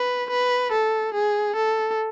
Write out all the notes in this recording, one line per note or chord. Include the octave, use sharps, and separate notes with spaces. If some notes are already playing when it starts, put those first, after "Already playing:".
Already playing: B4
B4
A4
G#4
A4